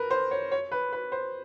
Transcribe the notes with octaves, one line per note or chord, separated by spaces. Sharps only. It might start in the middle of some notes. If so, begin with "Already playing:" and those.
Already playing: A#4 B4
C5
C#5
C#5
B4
B4
C5